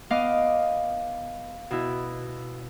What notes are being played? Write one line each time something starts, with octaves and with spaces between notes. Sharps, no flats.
B3 D#5 F5 D6
B2 E4